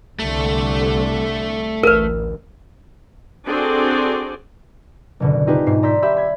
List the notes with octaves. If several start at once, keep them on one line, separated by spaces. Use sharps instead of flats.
C2 D3 A3
A1 D2 A#4 B4
C4 D4 F#4 G#4 A4 D5
F#1 B2 D3
C4 D#4 F4 G4 G#4 B4
G#2 B2 C7
D5 A#5 C6 E6 G6 B6
G4 E5 B5 E6 G6
B5 G#6